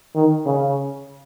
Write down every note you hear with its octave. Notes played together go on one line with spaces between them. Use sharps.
D#3
C#3